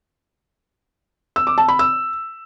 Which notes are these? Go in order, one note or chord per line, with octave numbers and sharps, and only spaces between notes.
E6
D6
A5
B5
E6